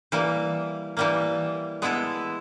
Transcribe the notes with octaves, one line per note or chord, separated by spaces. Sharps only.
E3 G3 A#3
E3 G3 A#3
G#3 B3 E4 A4